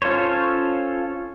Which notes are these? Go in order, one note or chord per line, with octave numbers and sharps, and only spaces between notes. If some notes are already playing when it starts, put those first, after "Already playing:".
C#4 F4 A4 C5 C#5